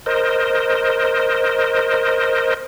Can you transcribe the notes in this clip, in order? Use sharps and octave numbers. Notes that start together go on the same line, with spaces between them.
A#4 C5 D#5